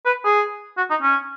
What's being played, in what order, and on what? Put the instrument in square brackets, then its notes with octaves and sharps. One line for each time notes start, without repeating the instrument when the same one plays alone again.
[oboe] B4
G#4
F#4
D#4
C#4